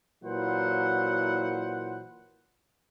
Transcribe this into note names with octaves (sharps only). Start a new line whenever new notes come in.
A#2 E3 F#3 E4 C5 F#5